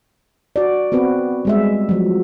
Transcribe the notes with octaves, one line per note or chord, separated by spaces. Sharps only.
F#4 D5
B3 C4 F#4 B4
G3 G#3 E5
F3 F#3